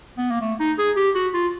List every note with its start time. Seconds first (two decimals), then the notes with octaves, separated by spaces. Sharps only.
0.18 B3
0.31 A#3
0.42 A3
0.60 D#4
0.79 G#4
0.97 G4
1.15 F#4
1.34 F4